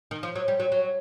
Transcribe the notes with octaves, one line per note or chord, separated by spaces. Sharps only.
D#3
F3
F#3
G3
F#3
F#3